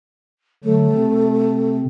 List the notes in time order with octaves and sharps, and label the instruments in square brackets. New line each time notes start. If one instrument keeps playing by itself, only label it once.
[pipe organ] D3 F#3 [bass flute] A3
[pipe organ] C3 C4